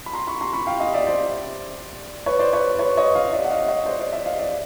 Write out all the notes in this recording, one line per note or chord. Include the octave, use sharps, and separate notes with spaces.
B5
A#5 C6
B5 C#6
A#5 C6
B5 C#6
F5 G5
D#5 F5
D5 E5
C5 D5
B4 C#5
C5 D5
B4 C#5
B4 C#5
C#5 D#5
D#5 F5
D5 E5
F#5
D#5 F5
C#5 D#5
C5 D5
C5 D5
D5 E5
D#5 F5
D5 E5